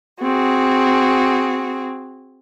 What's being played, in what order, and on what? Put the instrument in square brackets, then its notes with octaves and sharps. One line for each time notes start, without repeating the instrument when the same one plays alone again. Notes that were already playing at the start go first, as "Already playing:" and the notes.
[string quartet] C4 F#4 G#4